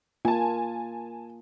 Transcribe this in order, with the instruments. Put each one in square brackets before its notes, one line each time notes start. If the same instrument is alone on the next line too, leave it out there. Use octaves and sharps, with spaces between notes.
[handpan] A#3 F4 [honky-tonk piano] G#5 A5